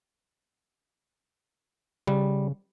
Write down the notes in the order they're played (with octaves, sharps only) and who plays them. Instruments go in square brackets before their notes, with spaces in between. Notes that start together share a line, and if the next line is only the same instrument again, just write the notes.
[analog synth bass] C#3 [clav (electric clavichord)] G3